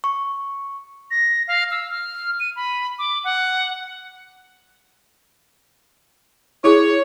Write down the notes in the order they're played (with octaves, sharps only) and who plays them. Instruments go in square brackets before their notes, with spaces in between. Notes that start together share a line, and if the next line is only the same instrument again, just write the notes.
[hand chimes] C#6
[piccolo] A#6
F5
E6
F6
D#7
B5
D6
F#5
[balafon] E4 G#4 [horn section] C#5